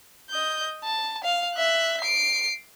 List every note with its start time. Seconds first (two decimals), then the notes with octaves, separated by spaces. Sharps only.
0.30 D#5 G6
0.84 A5
1.24 F5
1.55 E5 F#6
2.01 C7 D7